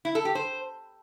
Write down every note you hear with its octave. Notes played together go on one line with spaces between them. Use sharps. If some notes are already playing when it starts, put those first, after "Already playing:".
E4
A4
G4
C5